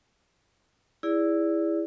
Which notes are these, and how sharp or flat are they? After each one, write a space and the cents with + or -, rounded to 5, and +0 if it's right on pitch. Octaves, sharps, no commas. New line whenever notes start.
E4 +0 G#4 -20 D5 -15